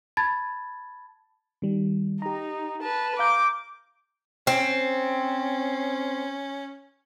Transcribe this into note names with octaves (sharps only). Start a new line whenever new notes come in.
A5 B5 G#6 A6
D#3 G3
D#4 G4 A#5
B4 A5
F5 A#5 D6 G6
C4 C#4